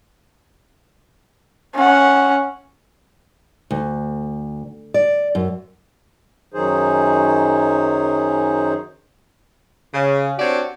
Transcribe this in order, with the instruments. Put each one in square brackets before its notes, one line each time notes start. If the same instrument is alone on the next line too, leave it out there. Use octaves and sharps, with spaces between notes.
[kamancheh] C#4 F#5
[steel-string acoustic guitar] D2
D5
F#2
[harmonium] F#2 D#3 F#3 D#4 G#4 C5
[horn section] C#3
C4 D4 F#4 G4 C#5 D5